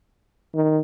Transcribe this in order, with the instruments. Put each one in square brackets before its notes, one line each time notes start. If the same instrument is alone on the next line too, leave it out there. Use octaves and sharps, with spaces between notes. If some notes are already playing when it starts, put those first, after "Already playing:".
[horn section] D#3